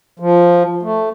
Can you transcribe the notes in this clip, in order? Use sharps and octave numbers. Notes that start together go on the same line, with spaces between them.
F3
A3